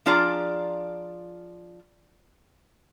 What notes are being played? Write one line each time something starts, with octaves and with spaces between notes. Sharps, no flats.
F3 D4 F4 G#4 D5 A#5